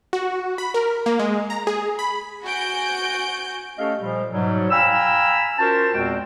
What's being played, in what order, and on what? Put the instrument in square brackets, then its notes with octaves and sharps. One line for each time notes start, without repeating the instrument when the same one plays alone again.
[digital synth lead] F#4
B5
A#4
A#3
G#3
A#5
G#4
B5
[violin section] F#4 G#5 G6 D7
[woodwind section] A3 C#4 G4 A4 D#5 F5
A#2 F3 G3 G#3
G#2 B2 F#3 G3
F5 G5 G#5 A#5 B5 E6
C#4 F4 F#4 A#4 C5 A5
E2 A#2 G#3 C4 F#4 G5